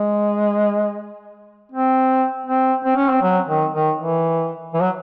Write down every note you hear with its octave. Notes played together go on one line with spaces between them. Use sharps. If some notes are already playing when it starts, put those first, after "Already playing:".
Already playing: G#3
C4
C4
C4
C#4
C4
F#3
D#3
D#3
E3
E3
F#3